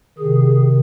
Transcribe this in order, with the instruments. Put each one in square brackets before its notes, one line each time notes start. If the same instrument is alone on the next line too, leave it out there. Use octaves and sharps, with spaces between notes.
[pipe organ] C3 D#3 G#4